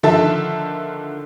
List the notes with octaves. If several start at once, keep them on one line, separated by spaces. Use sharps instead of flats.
D3 D#3 F3 A4 E5 A5